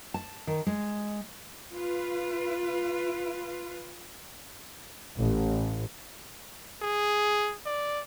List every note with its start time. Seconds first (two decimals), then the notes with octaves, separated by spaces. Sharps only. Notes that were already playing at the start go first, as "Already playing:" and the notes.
0.14 A5
0.47 D#3
0.67 G#3
1.76 F4 B4
5.19 A1
6.82 G#4
7.66 D5